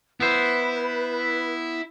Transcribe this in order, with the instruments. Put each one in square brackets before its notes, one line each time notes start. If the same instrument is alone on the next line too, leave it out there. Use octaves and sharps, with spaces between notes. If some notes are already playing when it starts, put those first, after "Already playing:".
[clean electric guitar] B3 C5 [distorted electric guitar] E4 [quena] B4